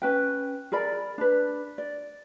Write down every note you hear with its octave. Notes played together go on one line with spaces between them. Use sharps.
C#4 B4 G5
G#4 A#4 D5 B5
D4 B4
D5